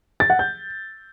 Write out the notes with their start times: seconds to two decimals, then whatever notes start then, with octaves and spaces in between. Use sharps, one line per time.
0.20 A6
0.30 F#5
0.39 G6